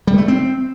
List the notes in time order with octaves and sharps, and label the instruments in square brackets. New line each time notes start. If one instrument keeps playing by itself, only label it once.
[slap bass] G3
A3
C4